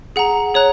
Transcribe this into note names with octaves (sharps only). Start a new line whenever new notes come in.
G#4 F#5 A#5
G#4 C#5 A#5 F#6